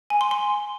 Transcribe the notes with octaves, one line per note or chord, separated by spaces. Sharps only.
G#5
C6
C6